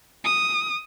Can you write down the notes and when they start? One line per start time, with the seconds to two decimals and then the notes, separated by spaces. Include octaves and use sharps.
0.25 D#6